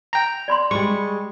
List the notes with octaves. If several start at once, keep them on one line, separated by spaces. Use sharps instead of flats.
G5 A#5
D5 B5 C6
G3 G#3 C#6